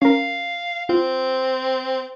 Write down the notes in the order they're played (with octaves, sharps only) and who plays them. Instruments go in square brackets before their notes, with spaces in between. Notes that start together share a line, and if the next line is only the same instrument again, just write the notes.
[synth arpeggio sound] C#4 A#4 [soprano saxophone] F5
[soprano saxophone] C4 [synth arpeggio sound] F4